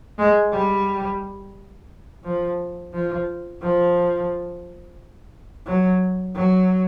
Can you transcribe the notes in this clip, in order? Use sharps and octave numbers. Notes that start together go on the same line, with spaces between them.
G#3
G3
F3
F3
F3
F#3
F#3